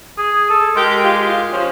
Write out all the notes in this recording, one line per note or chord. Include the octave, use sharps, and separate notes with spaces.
G#4
A4
G#3 G4 A#4
F4 G4
F4
F3 C#4